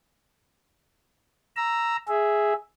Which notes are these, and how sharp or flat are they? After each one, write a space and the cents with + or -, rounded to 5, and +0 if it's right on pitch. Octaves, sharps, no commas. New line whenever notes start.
A#5 +0 E6 +10
G#4 +0 E5 +0